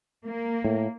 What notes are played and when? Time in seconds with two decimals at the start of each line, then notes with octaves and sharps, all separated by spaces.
0.25 A#3
0.64 A2